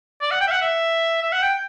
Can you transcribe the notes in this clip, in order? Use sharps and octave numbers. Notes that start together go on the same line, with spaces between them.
D5
F#5
G5
E5
F#5
E5
E5
F#5
G5